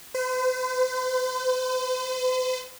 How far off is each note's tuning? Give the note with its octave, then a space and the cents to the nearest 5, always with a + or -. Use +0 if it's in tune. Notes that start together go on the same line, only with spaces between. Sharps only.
C5 -45